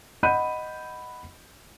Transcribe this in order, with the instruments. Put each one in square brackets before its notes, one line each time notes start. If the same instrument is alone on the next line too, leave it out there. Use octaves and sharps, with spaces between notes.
[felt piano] D#5 F#5 B5 G6 D#7